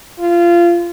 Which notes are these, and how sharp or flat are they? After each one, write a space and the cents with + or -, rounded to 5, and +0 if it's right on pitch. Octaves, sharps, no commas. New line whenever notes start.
F4 -20